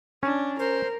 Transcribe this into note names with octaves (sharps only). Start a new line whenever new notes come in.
C#4 D4
A#4 C5